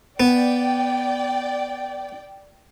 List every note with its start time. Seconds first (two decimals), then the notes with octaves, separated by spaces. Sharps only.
0.20 B3 D5 G5